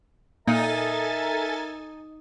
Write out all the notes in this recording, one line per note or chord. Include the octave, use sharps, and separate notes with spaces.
A#2 D#4 A4 A#4 E5 G#5 A#5 A6